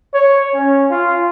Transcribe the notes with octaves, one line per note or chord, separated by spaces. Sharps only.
C#5
C#4
F4